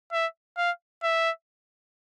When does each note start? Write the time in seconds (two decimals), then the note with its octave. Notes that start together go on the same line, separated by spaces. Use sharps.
0.13 E5
0.58 F5
1.03 E5